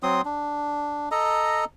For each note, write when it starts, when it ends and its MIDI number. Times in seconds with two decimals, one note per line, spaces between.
0.03 0.21 54
0.03 0.21 60
0.03 0.21 84
0.03 0.21 87
0.25 1.09 62
1.11 1.65 69
1.11 1.65 75
1.11 1.65 82